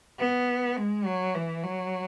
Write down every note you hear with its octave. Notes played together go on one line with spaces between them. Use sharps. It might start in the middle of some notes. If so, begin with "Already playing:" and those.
B3
G#3
F#3
E3
F#3